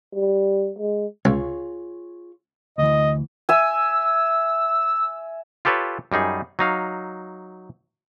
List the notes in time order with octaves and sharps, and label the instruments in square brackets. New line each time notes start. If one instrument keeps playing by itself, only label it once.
[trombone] G3
G#3
[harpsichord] C#2 [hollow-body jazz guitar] F4 G#4 C#5
[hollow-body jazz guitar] D2 E3 [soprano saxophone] D#5
[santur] E5 G#5 [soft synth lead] E6
[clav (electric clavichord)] F4 G4 A4 B4 C#5
F#2 G3 D#4 G#4
F#3 D#4 F5